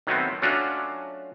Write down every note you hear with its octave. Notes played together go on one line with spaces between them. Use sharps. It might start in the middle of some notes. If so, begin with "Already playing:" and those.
D#3 F#3 A3 B3 C4
F#3 A3 C#4 D4 F4 F#4